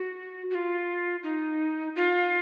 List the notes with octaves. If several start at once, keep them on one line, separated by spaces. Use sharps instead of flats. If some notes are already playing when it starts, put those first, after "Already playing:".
Already playing: F#4
F#4
F4
D#4
F4